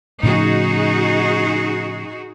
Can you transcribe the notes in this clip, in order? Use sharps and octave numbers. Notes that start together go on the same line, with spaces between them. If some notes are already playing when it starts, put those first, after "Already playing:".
A2 C#3 F3 D#4 F#4 G#4